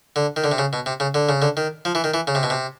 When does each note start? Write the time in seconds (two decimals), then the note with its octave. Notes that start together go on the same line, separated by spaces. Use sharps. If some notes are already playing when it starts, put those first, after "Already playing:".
0.16 D3
0.36 D#3
0.44 D3
0.52 C3
0.58 C#3
0.73 B2
0.86 C3
1.00 C#3
1.14 D3
1.29 C#3
1.42 D3
1.57 D#3
1.85 F3
1.95 E3
2.04 D#3
2.14 E3
2.27 C#3
2.35 C3
2.43 B2
2.50 C3